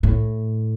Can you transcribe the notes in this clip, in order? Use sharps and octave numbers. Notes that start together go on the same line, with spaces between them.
A2